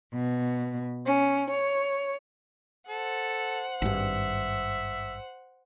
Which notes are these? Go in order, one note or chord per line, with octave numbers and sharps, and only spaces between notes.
B2
C#4
C#5
A4 C5 F#5
G#1 G2 E5